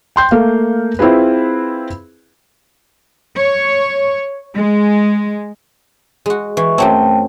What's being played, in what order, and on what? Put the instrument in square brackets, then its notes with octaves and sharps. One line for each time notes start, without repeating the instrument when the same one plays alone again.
[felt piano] G5 C6 G6
A3 A#3 F5
C4 E4 F4 G#4 B4
[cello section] C#5
G#3
[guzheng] G#3 F#4
[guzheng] E3 [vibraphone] C#6
[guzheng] F#2 F#3 C4 [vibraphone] A3 G5 A5